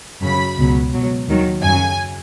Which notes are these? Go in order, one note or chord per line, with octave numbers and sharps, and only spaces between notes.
F#2 C#3 F#3 B5
C#2 B2 F#3
C#2 B2 F#3
D#2 D#3 F#3
F#2 C#3 F#3 G#5